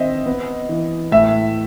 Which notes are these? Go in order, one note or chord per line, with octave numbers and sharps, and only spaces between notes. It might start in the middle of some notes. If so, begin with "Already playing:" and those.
Already playing: D#3 C4 C5 D#5 E5
B3
E3
A2 E5